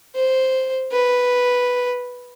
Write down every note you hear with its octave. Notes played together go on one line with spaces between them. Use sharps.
C5
B4